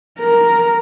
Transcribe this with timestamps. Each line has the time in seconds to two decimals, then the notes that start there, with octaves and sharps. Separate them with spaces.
0.19 A#4